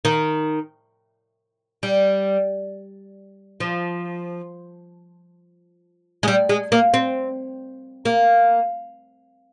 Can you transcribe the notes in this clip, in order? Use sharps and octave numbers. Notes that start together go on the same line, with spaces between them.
D#3
G3
F3
G#3
G3
G#3
A#3
C4
A#3